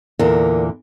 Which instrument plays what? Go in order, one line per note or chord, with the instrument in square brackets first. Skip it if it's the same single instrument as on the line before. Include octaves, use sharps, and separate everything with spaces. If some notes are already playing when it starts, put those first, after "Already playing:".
[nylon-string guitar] E2 A#2 D3 [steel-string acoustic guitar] A#4